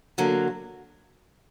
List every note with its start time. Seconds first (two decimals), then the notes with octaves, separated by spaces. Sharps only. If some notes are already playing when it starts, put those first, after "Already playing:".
0.18 D3 F#3 A#3